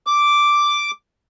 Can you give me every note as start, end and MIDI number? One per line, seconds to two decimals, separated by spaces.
0.07 0.91 86